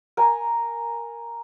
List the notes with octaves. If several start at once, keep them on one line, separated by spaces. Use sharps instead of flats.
A#4 G#5